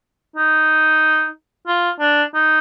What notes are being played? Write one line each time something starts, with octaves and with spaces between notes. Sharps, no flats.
D#4
F4
D4
D#4